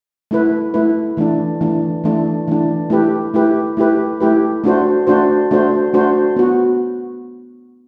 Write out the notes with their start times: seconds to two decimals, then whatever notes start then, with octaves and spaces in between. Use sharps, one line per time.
0.31 A3 E4 B4
0.74 A3 E4 B4
1.17 E3 A3 D4
1.61 E3 A3 D4
2.04 E3 A3 D4
2.47 E3 A3 D4
2.90 A3 E4 G4 B4
3.34 A3 E4 G4 B4
3.77 A3 E4 G4 B4
4.20 A3 E4 G4 B4
4.64 A3 D4 F#4 C5
5.07 A3 D4 F#4 C5
5.51 A3 D4 F#4 C5
5.94 A3 D4 F#4 C5
6.36 B3 F#4